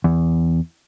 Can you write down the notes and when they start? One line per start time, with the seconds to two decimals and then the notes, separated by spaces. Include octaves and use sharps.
0.04 E2